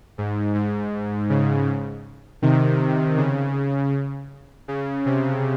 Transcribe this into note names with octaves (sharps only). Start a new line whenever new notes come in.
G#2
G#2
C#3
C3 D#3
C#3
C#3
C3